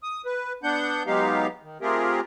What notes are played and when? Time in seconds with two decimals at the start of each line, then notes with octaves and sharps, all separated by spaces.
0.03 D#6
0.26 B4
0.63 B3 D4 F#5 G6
1.07 F#3 G#3 B3 D#4 G4 F5
1.63 D#3
1.81 A3 C4 F4 G4 G#4 A#4